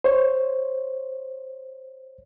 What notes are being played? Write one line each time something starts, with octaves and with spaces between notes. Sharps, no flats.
C5 C#5